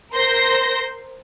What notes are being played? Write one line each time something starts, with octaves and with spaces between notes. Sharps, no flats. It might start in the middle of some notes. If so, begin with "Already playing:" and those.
A#4 C5 C6 G6 A#6